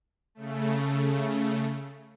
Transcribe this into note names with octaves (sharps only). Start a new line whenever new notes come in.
C#3 A3